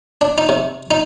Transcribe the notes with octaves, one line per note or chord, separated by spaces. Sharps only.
D4
D#4
C3
D#4